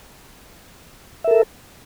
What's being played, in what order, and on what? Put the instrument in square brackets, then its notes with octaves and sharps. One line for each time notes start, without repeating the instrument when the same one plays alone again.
[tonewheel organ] E5
A#4
A4